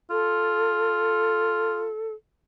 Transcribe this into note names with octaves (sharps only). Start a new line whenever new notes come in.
F4 A4